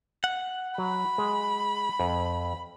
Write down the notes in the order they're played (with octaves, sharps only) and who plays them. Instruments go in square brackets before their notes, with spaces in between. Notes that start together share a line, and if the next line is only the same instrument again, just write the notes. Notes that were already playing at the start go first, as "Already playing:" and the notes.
[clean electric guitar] F#5
[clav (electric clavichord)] F#3 [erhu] B5
[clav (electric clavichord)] G#3
F2